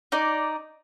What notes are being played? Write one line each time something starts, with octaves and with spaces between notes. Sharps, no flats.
D#4 D5